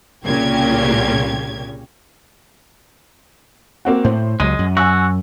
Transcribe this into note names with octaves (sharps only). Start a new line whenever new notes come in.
C2 A#2 C#3 C#4 G4 G#6
A#3 C4 F#4
A2 C5
C#2 F#3 G#3 D#7
F#2
F#4 G#5 E6